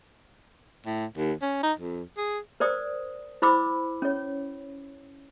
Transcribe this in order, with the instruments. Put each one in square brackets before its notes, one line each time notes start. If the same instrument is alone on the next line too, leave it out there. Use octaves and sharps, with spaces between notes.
[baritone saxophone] A2
D#2
C#4
D#4
F2
G#4
[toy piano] A#4 C5 D5 D#6
E4 C5 B5 D6 E6
C#4 C#5